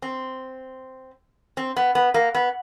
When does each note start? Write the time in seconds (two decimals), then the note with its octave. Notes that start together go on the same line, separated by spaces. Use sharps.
0.02 C4
1.57 C4
1.76 B3
1.95 B3
2.14 A#3
2.35 B3